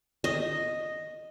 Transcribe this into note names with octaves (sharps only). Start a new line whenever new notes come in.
D#5